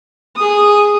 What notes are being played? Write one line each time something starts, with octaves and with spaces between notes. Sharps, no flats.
G#4 D#6